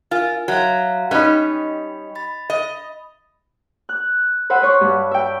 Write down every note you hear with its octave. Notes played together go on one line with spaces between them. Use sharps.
F4 A#4 G#5
F#3 F#4 E5 F5
G3 C#4 D#4 B4 D#5 G5 B5
B5 A6
D#5
F#6
B4 C5 E5 F#5
B4 C#5 C#6
G2
E5 G5